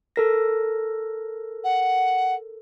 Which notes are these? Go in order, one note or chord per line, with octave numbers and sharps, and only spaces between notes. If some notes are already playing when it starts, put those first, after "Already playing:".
A4 A#4 A#6
F#5